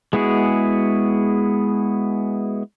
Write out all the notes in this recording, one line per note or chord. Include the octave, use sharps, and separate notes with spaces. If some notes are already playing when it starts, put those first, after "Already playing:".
G#3 B3 E4 F#4 G#4